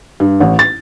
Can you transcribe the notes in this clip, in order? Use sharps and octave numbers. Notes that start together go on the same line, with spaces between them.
G2
A1
A6